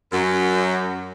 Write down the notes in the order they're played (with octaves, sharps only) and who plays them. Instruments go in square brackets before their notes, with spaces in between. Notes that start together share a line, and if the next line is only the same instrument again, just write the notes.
[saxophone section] F#2